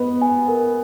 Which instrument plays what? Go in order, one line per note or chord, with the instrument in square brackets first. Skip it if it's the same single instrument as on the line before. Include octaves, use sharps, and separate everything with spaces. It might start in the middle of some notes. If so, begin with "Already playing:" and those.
Already playing: [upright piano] B3 [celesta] B4 D#5 B5
[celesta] G#5
A#4